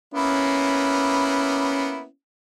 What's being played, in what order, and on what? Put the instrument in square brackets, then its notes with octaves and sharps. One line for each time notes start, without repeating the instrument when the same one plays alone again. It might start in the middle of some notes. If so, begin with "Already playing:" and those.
[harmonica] A#3 B3 E4 [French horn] C#4